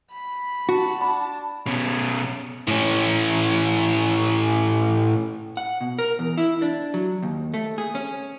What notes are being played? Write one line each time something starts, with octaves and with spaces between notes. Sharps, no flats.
B5
F#4 A5
D4 B5
B2 C#4
A2 C#4
F#5
B2
A#4
E2
E4
D4
F#3
D#2
A3
G#4
C#4